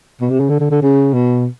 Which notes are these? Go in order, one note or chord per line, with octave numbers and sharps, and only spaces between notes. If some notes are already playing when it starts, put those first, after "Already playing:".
B2
C3
C#3
D3
D3
D3
C#3
B2